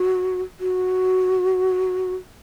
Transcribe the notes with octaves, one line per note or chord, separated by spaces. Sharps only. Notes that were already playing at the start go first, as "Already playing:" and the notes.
Already playing: F#4
F#4